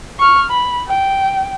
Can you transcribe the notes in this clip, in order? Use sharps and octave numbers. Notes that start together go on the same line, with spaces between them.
C#6 F6
B5
G5